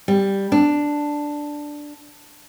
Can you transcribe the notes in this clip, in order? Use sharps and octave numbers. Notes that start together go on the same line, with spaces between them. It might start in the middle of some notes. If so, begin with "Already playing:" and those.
G3
D4